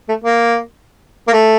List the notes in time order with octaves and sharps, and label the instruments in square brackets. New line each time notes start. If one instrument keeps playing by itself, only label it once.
[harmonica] A3
A#3
A#3
A3